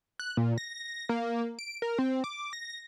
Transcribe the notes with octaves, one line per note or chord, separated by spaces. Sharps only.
F#6
A#2
A#6
A#3
D7
A#4
C4
D6
A#6